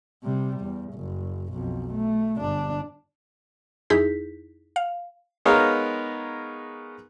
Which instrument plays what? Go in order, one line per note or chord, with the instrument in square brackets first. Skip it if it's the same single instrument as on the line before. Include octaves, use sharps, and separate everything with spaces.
[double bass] C3 G3
E2
F#1
B1 F2
A3
G1 D4
[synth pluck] F2 D#4 E4 G#4 G6 B6
F5
[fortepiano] G#3 B3 D#4 A#4 C#5 F5